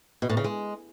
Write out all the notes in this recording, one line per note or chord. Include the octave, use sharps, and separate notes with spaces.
B2
A2
C#3
G#3